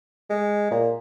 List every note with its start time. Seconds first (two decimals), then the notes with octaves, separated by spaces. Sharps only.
0.29 G#3
0.71 A#2